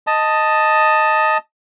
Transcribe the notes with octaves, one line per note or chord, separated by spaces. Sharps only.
D#5 A5